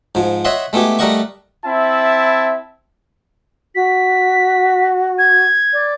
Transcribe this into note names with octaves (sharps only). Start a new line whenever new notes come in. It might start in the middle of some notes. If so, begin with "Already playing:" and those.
G#2 F3
C#5 D#5 E5 F#5 C6
G#3 A3 B3 E4 G4
G3 A3 A#4 D#5 F#5 C#6
C4 E4 E5 A5
F#4 B6
G#6
D5